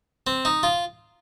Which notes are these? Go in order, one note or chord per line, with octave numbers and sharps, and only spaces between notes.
C4
D#4
F4